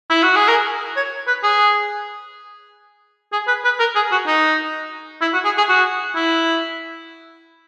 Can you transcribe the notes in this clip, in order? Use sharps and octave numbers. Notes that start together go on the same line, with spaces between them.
E4
F#4
G#4
A#4
C#5
B4
G#4
G#4
B4
B4
A#4
G#4
F#4
D#4
E4
F#4
G#4
G#4
F#4
E4